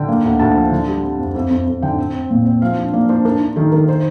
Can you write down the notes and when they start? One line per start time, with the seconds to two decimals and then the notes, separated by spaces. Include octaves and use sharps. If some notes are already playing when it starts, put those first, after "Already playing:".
Already playing: D3 G5
0.08 A#3
0.25 D2
0.39 D2 A5
0.55 F3
0.72 D3
0.87 G3
1.03 C4
1.19 F2
1.35 F2
1.51 F2
1.67 F2
1.82 D3 G5
1.98 C4
2.14 C4
2.31 A#2
2.45 C4
2.62 F3 F5
2.78 D4
2.93 A#3 D5
3.09 D4 C5
3.25 D4 A#4
3.40 D4
3.56 D#3 A4
3.72 D#3 A#4
3.88 C5